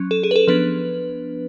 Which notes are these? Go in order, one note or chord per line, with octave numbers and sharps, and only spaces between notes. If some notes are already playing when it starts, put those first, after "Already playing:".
Already playing: F#3 C#4
A4
G#4
B4
A4
F3 B3 D4 B4